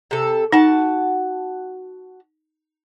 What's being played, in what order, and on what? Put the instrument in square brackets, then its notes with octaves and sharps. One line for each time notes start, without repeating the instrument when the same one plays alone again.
[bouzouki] C3 A4
[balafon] D#4 [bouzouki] F#4 A5